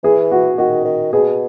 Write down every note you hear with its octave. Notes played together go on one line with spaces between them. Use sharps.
E3 G#4
F#4
D#3 F#4
D#3
B2 G#4